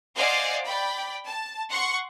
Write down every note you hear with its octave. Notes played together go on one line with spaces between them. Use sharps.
C5 D5 D#5 F5 F#5 G#5
D5 G5 B5
A5
F#5 C6 C#6